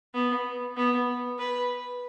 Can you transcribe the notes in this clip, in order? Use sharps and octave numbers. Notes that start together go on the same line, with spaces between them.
B3
B3
B4